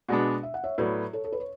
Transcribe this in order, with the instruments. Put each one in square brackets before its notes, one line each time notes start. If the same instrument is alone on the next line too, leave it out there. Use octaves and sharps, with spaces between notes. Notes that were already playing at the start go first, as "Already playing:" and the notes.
[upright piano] B2 G#3 B3 D4 [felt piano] D5 F#5
[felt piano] E5
F#5
C#5 E5
[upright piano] A2 F#3 B3 [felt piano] B4 D5
[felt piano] A4 C#5
A4
B4
C#5